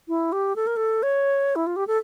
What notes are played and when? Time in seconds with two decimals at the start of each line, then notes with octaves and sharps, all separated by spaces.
0.08 E4
0.32 G4
0.56 A4
0.67 A#4
0.76 A4
1.03 C#5
1.56 E4
1.66 F4
1.76 G4
1.87 A4